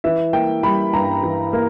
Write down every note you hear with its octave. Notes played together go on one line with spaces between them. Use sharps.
E3 E5
A#3 G5
G3 B5
G2 A#5
E3
A#3